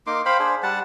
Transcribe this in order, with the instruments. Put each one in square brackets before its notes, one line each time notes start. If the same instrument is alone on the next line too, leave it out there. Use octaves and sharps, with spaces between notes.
[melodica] A#3 D#4 C6 D6
C5 F5 G5 B5
D4 G#4 C5
G3 F#5 A5